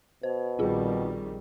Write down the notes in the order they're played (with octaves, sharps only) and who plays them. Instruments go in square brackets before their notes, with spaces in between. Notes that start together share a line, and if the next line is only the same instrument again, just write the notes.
[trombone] B2 [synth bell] C5
[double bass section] A#1 D#3 G3 [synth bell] C4 F4 G#4